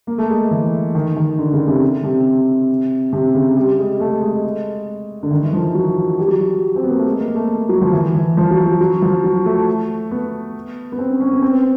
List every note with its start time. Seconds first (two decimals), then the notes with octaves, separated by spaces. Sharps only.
0.07 A#3
0.18 A3
0.30 G#3
0.51 E3
0.95 D#3
1.16 D#3
1.38 D3
1.53 C#3
1.67 C3
2.04 C3
3.13 C3
3.35 C#3
3.56 G3
3.79 G#3
4.00 A3
4.22 G#3
5.23 D3
5.31 D#3
5.43 E3
5.53 F3
5.74 F#3
6.18 G3
6.28 F#3
6.37 G3
6.76 C4
6.84 B3
6.90 A#3
6.98 A3
7.06 G#3
7.20 A#3
7.35 A3
7.69 F#3
7.81 F3
7.93 E3
8.15 E3
8.37 F3
8.51 F#3
8.66 F#3
8.81 F#3
9.02 F3
9.24 F#3
9.46 A3
10.11 B3
10.92 B3
10.98 C4
11.10 C#4
11.20 C#4
11.32 B3
11.42 C4